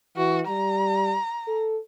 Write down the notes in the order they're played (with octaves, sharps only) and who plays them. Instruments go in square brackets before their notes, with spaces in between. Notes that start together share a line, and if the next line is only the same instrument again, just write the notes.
[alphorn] E3 [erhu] F#4
[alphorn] G3 [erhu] A#5
[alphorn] A4